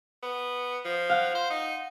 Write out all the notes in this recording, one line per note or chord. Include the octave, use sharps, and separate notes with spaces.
B3
F3
F5 F#5
C5
D#4